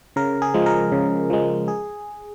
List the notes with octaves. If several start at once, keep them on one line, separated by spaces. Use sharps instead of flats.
C#3 A#4
G#4
F3 G#3
A#4
C#3
F3 G#3
G#4